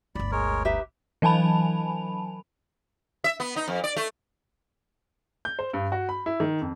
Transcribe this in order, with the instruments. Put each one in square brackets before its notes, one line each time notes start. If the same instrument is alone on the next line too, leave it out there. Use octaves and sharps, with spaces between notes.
[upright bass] G1 D2 [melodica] D5 B5
[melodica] G#3 A#4 C#5
[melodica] D#4 [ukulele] G4 B4 E5
[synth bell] E3 F#3 G#5 A5 B5 F7
[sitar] E5
B3
D#4
F2
D5
A3
[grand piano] G6
C5
G2
F#4
B5
E4
D#3
F2